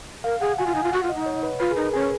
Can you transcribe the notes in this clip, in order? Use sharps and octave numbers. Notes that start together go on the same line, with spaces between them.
A#4 F5
G#4 F#5
F#4 G#5
F4
D#4 G#5
F4
F#4 F#5
F4
D#5
D#4
C#5
B4
F4 B4
G#4
D#4 A#4
C#4 G#4